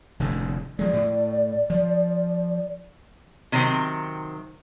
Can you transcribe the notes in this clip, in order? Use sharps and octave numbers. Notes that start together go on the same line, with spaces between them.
F1 A2 D3
F3 G#3 D5
A2
F3
C3 D#3 F#3 C4